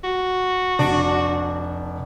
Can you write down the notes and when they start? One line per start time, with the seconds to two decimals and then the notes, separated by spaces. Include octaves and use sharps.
0.04 F#4
0.79 F1 D4